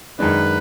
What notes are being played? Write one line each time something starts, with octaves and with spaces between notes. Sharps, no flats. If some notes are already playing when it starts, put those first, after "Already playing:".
F#2 D#3 G#3 D4 B4